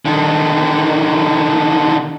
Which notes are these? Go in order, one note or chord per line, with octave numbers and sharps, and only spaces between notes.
D3 D#3